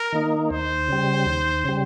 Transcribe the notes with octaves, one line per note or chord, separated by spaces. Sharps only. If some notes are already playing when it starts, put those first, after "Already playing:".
Already playing: A#4
D#3 A#3 D#4
D#2 C5
C#3 G3
D#2
C#3 G3